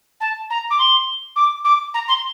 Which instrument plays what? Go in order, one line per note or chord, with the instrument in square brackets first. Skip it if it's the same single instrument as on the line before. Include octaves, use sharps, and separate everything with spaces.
[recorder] A5
A#5
D6
C6
D6
D6
A#5
C6